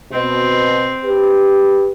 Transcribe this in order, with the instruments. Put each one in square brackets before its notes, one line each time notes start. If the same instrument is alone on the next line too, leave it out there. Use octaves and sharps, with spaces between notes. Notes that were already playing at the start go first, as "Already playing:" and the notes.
[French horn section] B2 [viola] C4
[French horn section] G4 B4